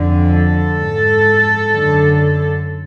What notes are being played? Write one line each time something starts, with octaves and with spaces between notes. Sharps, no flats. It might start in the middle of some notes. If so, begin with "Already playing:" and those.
Already playing: F2 D3
A4
G#2
F#2 D3